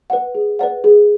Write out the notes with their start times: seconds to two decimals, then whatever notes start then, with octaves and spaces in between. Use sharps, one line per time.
0.10 B4 D5 F#5
0.35 G#4
0.59 B4 D5 F#5
0.84 G#4